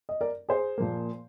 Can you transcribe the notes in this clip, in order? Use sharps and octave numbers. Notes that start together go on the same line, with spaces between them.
D#5
A#4 D5
G#4 C5
A#2 F3 A#3